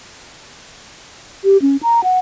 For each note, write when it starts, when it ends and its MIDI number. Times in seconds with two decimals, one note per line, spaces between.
1.44 1.57 67
1.62 1.77 61
1.83 2.03 82
2.04 2.19 78